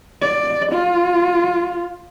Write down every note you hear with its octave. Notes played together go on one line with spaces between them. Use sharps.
D5
F4